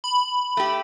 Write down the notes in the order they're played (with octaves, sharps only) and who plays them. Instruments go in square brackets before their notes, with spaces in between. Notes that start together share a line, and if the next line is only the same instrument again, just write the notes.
[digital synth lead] B5
[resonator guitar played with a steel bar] A3 G4